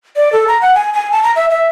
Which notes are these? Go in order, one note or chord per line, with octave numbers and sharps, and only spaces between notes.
D5
A4
A#5
F#5
G#5
G#5
A5
A#5
E5
E5